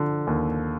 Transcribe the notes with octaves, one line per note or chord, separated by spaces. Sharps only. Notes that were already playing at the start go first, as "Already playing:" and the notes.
Already playing: D3 F3
D#2